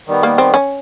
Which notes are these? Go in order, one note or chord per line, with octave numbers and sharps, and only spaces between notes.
D#3 G3 B3
A#3
C4
C#4